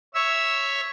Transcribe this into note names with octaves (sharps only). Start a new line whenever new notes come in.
C#5 E5 E6